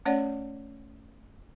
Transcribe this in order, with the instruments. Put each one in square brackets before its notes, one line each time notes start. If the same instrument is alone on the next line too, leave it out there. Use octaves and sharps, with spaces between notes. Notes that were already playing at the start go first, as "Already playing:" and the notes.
[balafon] A3 C#4 C#5 D5 F#5